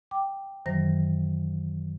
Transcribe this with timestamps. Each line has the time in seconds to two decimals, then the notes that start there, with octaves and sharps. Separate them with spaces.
0.11 G5 D6
0.66 F#2 D#3 E3 F#3 C5 A#6